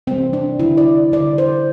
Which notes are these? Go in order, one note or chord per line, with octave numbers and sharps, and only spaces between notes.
C3 E3 G3 C4
D4
D3 G3 E4
D5
D3 G3 D5
C5